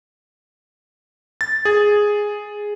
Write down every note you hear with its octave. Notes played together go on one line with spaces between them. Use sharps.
A6
G#4